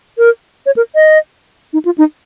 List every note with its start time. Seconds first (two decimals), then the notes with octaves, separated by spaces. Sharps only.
0.18 A#4
0.66 C#5
0.76 A#4
0.95 D#5
1.73 D#4
1.85 F4
1.98 D#4